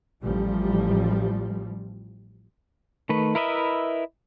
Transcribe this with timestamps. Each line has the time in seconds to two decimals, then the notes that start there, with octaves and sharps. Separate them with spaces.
0.22 A1 F3 G3
3.09 D#3 A3 B4
3.35 E4 A#4 B4 D#5 E5